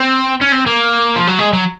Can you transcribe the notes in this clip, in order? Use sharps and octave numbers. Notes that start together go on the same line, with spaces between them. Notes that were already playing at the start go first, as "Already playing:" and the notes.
Already playing: C4
C#4
C4
A#3
F3
F#3
G#3
F#3